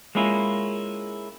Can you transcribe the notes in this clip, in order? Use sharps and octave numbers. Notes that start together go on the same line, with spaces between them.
G#3 A#3 C#4 E4 F4